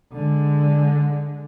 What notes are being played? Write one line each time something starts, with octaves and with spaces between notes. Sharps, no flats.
D3 G#3